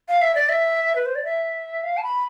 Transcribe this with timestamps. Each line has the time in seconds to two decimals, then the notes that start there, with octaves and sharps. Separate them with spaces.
0.08 F5
0.21 E5
0.35 D5
0.49 E5
0.95 B4
1.06 C5
1.15 D5
1.25 E5
1.83 F5
1.97 A5
2.03 B5